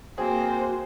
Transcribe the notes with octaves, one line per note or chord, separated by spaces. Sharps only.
A#3 C4 F#4 G#4 C5